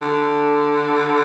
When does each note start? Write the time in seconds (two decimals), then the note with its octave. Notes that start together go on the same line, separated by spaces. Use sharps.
0.02 D3